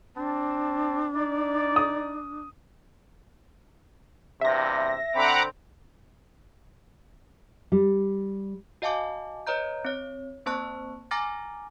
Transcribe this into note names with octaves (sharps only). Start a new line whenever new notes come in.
C4 D4 A5
D#4 D5
D#6
E2 G2 C3 E5 A#6
D3 C4 F#5 A#5 B5 D6
G3
F#4 D#5 F5 G#5 A5 D6
B4 C#5 D#5 A#5 G6
C4 C#5
A#3 C4 C5 A5 C#6 F#6
G#5 A#5 D6 F6 A6 A#6